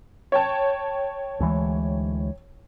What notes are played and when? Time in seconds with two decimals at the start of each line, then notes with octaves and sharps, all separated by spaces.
0.32 C#5 G5 A5
1.40 D2 E3 G#3